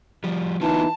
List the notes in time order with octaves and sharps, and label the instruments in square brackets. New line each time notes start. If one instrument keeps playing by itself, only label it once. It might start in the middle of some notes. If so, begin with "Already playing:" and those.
[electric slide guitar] F3 G3
[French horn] E3 [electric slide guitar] B3 F4 F#4 [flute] D#4 [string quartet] A5